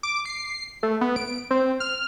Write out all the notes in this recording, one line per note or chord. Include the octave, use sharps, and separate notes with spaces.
D6
C7
A3
B3
D7
C4
F6